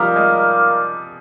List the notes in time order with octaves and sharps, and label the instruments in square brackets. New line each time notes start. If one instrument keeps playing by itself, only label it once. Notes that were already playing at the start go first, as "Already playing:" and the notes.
Already playing: [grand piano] F3 G3 [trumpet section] D#4 A#4 D5 F5
[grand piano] G#3